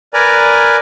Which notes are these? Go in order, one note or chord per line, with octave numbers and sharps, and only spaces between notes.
A#4 B4 D5 G#5 A#5